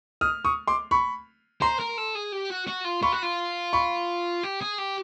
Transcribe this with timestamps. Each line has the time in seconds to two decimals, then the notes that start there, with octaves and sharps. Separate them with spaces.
0.21 D#6 F6
0.45 C#6 D#6
0.67 C6 D6
0.91 B5 C#6
1.61 C5 A#5 C6
1.80 A#4
1.98 A4
2.15 G#4
2.32 G4
2.50 F#4
2.67 F#4
2.84 F4
3.03 F4 B5 C#6
3.12 F#4
3.23 F4
3.73 B5 C#6
4.43 G4
4.61 G#4
4.78 G4